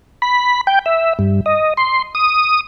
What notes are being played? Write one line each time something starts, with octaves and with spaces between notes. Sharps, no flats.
B5
G5
E5
G2
D#5
C6
D#6